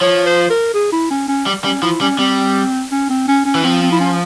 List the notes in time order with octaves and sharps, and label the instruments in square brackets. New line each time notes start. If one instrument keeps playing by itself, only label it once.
[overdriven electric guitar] F3 [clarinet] C#5
[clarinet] C5
A#4
G#4
E4
C#4
C#4
[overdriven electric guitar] G3
[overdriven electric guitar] G3 [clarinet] C#4
[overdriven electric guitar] F3 [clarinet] E4
[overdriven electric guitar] G3 [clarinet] C#4
[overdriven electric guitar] G3 [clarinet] C4
[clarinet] C#4
C4
C#4
C#4
[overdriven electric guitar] E3
[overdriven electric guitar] F3 [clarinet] C4
[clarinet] C4
E4
C#4